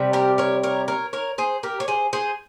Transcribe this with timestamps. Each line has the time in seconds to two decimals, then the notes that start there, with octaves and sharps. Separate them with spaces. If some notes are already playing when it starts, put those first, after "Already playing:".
Already playing: C3 G3
0.13 G4 A#4
0.38 A#4 C#5
0.63 A#4 C#5
0.88 A#4 C#5
1.13 A#4 C#5
1.38 G#4 C5
1.63 G4 A#4
1.80 C#5
1.88 G#4 C5
2.13 G#4 C5